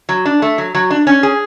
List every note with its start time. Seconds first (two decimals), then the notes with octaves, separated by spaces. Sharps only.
0.09 F#3
0.25 D4
0.42 A3
0.58 F#3
0.75 F#3
0.90 D4
1.07 C#4
1.23 G#4